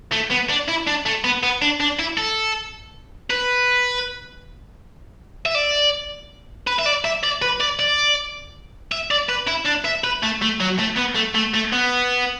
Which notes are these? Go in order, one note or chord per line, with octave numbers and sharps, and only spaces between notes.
A3
B3
D4
E4
D4
A3
B3
B3
D4
D4
E4
A4
B4
E5
D5
B4
E5
D5
E5
D5
B4
D5
D5
E5
D5
B4
E4
D4
E5
B4
A3
A3
F#3
A3
B3
A3
A3
A3
B3